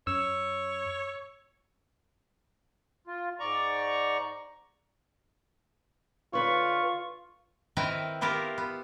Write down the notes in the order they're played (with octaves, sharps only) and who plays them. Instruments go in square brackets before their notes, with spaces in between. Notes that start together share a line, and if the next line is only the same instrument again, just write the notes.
[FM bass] F#2 [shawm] C#5 [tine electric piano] E6
[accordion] F4
G#2 D5 A#5 C#6
[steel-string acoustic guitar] D3 B4 C#5 [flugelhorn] F4 [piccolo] C#6
[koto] D#3 C4 E4 A#4 B4 G5
B3 E4 F4 G4 A#4
B3